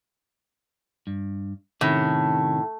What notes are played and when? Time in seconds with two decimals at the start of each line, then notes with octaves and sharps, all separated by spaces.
1.07 G2
1.81 A2 C3 D#3 C#4